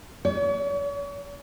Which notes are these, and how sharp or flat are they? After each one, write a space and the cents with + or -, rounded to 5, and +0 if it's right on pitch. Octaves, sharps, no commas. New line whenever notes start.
C#5 +40